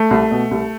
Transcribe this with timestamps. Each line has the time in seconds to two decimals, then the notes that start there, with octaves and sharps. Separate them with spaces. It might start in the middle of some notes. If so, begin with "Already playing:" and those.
Already playing: A3
0.11 C2
0.31 B2
0.51 C2